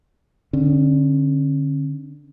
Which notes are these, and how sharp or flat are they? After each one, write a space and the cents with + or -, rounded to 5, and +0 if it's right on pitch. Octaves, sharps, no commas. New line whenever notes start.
D3 +0 C#4 -40